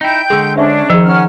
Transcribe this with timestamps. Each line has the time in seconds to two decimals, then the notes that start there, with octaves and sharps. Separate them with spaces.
0.01 D#4 E4 G5 G6
0.30 D3 G#3 G#4 C#6 E6
0.56 C#4 D4 C5 E5 C#6
0.90 D#3 F3 G#4 C5
1.04 C#4 F#5 F6